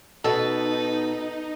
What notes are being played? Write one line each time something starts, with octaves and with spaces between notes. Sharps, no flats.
B2 D#4 A4 B4